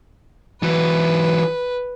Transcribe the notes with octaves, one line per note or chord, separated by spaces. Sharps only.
E3 F#3 B4